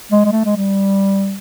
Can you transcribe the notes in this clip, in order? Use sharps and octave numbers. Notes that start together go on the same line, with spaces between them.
G#3
G#3
A3
G#3
G3